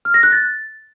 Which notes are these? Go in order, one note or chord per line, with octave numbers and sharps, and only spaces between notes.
F6
A#6
F#6
A6